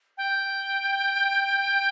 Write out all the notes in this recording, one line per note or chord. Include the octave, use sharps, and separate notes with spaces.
G5